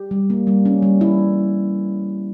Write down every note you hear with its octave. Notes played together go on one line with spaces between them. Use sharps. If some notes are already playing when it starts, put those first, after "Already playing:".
Already playing: G4
G3
A#3
G3
C#4
G3
E4